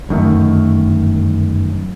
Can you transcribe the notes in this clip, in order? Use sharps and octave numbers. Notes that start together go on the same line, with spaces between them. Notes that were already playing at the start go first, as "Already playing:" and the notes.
G1 F#2 D#3 A3